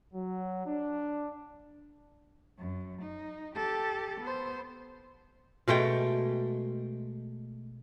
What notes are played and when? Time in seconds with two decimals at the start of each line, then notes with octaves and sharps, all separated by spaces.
0.13 F#3
0.66 D4
2.58 F#2
3.02 D#4
3.55 G4 A4
4.20 B3 C5
5.68 B2 G#3 A3 G5